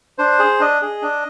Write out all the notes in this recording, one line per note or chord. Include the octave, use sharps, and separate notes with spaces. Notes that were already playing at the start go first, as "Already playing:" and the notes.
D4 C5
G#4
D4 D#5
G#4
D4